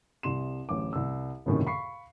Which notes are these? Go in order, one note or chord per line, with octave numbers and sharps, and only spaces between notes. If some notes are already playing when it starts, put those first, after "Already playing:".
C2 C3 C6 E7
D1 A1 D6
C2 E6
C#2 F#2 A2 C3 D#3
F5 B5 C#6 C7